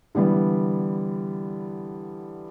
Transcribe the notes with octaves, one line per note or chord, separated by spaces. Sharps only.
D3 E3 G3 B3